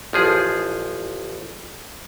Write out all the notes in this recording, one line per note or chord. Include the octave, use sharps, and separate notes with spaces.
A1 F3 G#4